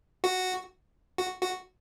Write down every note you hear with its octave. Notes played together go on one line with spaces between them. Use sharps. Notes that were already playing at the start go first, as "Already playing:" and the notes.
F#4
F#4
F#4